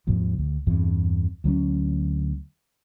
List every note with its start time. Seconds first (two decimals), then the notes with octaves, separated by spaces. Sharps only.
0.07 D#2 G#2 C3 F3
0.38 D2
0.67 E2 G2 E3 C4
1.44 D2 F#3 B3 C#4